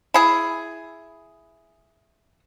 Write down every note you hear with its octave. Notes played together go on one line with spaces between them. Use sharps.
E4 G#4